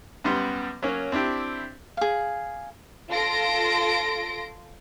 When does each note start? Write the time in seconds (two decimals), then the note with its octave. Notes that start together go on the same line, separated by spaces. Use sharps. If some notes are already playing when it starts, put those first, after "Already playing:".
0.24 F#2 G3 B3 C6
0.83 F#3 A#3 C#4
1.12 C4 D4 E4 G4
1.97 G#4 F5
3.09 F4 A4 C6 A#6 D7